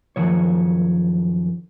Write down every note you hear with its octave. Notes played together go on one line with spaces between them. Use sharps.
F#2 D#3 F3 C#5